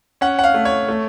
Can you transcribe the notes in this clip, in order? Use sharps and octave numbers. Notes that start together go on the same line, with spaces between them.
C#4 F#5
F#5
F5
A3
C#5
A3